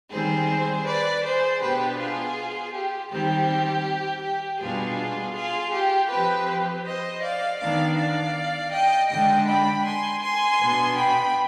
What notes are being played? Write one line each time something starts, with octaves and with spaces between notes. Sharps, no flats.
D#3 G3 C4 G#4 C5
B4 D5
G#4 C5
B2 B3 D4 G4 B4
F4 G#4
G4
D#3 G3 C4 G4
G4
B2 G3 D4 F4 G#4
F4 G#4
G4
F3 C4 G4 B4
G4
C5 D#5
D5 F5
D#3 B3 D4 D5 F5
D5 F5
D#5 G5
D3 G#3 D4 D#5 G5
G5 B5
G#5 C6
G#5 C6
B2 B3 D4
G5 B5